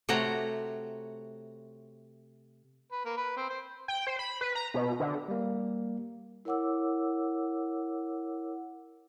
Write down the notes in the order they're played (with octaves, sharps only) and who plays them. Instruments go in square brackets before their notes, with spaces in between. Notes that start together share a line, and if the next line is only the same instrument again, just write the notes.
[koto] C3 A3 F#4 C#5 A#5
[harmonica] B4
A#3
B4
C4
C5
[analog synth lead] G5
C5
B5
B4
A#5
B2
D3
[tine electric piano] G3 A#3
[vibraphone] E4 A#4 C#5 F#5 D6 E6